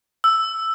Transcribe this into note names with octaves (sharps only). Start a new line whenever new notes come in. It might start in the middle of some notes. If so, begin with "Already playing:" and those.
E6